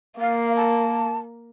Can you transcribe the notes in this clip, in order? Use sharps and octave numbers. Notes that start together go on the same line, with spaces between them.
A#3 F5
A5